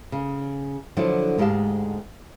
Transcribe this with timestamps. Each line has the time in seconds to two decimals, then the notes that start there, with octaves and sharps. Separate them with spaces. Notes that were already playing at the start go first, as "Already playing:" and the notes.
0.12 C#3
0.97 D3 F3 F#3 D4 E4
1.38 D2 G#2 G#3 G4 F5 A5